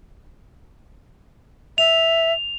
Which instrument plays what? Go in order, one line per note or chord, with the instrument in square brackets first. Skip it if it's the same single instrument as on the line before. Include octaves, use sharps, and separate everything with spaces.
[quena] E5 [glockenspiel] F7